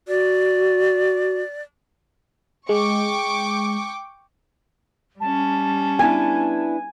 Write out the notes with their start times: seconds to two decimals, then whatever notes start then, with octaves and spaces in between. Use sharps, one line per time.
0.08 F#4 D5
2.69 G#3 G5 C#6 D6
5.20 G3 C#4 A5
5.99 B3 D4 E4 G#5